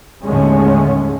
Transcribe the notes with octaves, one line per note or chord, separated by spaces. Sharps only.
D#2 A2 D3 G#3 C#4